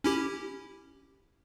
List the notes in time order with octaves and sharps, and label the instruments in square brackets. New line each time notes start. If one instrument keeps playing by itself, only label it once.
[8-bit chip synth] C#4 E4 G4